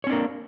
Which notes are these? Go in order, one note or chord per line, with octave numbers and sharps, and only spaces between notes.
A#3 C4 D4 C#5